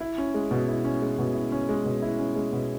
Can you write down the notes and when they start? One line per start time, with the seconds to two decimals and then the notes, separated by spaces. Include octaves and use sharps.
0.01 E4
0.18 C#4
0.34 G#3
0.51 B2
0.68 E4
0.85 C#4
1.02 G#3
1.19 B2
1.35 E4
1.52 C#4
1.69 G#3
1.85 B2
2.02 E4
2.19 C#4
2.35 G#3
2.53 B2